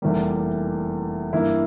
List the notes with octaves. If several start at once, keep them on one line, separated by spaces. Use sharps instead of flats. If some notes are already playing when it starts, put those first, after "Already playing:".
F1 E2 E3 G3 A#3
G2 E3 A#3 E4